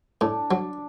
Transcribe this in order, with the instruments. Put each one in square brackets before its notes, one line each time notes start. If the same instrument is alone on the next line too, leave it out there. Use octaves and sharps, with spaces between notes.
[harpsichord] A2 [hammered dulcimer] D4
[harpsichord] F#3